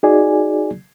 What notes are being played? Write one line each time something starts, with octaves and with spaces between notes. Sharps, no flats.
D#4 F#4 G#4 D5 G#5